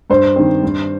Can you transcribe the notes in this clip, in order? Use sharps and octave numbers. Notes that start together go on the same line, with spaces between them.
G2 C5
D#3 C4
G2